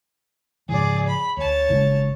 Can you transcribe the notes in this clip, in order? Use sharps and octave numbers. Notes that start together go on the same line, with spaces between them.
G#2 C#3 F3 G#4 D5
B5
D2 C#5 A5
G1 C#3 G#3